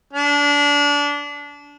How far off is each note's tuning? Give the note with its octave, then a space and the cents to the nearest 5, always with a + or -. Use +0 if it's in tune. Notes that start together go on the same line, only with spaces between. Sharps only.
D4 -25